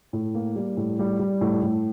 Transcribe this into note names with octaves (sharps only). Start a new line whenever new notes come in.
A2
A#3
G3
A2
G3
G3
A2
A2